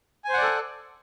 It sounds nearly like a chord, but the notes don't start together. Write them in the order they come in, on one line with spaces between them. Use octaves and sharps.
G#5 C5 F#5 D5 A4